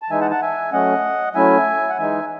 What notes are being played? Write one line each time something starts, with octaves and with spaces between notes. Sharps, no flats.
A5
E3 G#3 D#4 E5 G#5
F#5 A5
F#5 A5
E5 G#5
F#3 A3 C#4 D#5 F#5
F#3 A3 C#4 E4 E5 G#5
F#5
E3 G#3 D#4 E5 G#5